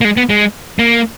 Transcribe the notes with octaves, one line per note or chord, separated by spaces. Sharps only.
A#3
G#3
B3
G#3
A#3